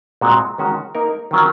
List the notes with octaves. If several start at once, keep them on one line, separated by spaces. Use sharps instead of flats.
A#2 G#3 C4 F#4
D#3 G#3 C#4 F#4
A#3 D#4 A#4
D#3 F#3 C#4 F4 A#4